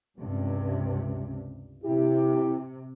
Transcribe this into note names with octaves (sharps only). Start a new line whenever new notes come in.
C#2 G2 C3
C3 E4 G4